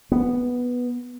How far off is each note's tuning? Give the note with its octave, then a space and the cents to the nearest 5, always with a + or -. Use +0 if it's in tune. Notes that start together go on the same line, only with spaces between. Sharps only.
B3 -5